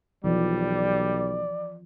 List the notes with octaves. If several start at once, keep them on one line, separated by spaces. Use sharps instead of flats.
B1 E3 F3 G3 D5